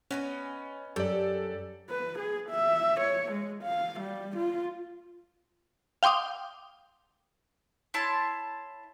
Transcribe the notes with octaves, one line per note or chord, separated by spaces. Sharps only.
B3 C#4 D#5 G#5
F#2 G4 A4 D5
B4
G#4
E5
C#5
G#3
F5
G3
F4
F5 G5 C6 D6 D#6
E4 C#5 A5 C6